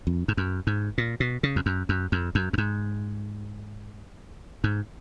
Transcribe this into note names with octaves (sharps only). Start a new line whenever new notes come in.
F2
G#2
F#2
G#2
A#2
B2
C#3
F2
F#2
F#2
F2
F#2
F#2
G#2
G#2